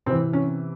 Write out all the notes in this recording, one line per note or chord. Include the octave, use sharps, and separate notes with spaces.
C3 E3 C4
C#4